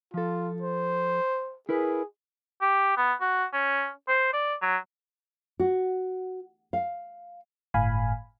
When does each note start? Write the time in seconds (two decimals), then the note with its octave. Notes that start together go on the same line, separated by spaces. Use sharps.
0.14 F3 F4 A4
0.62 C5
1.69 E4 G#4 A#4 B4
2.61 G4
2.97 B3
3.21 F#4
3.53 C#4
4.08 C5
4.33 D5
4.62 F#3
5.60 F#4
6.73 F5
7.74 G1 A2 F5 G#5 B5